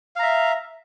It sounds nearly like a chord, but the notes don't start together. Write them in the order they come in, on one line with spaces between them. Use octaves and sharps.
F5 A#5 E5